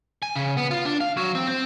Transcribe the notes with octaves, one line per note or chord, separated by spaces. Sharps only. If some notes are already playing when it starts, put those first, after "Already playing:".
G#5
C#3
B3
F4
D4
F5
F#3
C4
C4